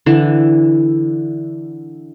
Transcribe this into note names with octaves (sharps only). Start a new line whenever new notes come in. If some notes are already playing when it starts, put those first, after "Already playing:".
D3 E3